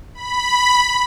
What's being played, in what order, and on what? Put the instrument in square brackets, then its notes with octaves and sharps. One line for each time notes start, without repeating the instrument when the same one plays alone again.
[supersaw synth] B5